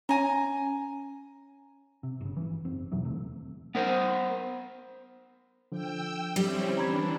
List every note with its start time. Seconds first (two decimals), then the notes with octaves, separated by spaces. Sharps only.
0.09 C#4 G#5 A#5
2.03 C3
2.21 G1 C#3
2.37 G1 E3
2.65 F#1 C4
2.92 E2 B2 E3 F#3
3.04 E1 D#2 C3 A3
3.75 B3 A#4 C5
5.72 D3 F3 G5 E6
6.36 G3 C4 C#4 E4
6.77 E3 D4 A#5 B5 G#6